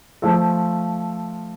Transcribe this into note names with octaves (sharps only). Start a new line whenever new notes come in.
F3 A3 F4 A4